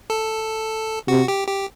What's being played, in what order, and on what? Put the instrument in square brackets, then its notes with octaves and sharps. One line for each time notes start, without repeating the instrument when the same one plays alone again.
[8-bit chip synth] A4
[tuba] C3 [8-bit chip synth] F#4
[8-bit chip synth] G4
G4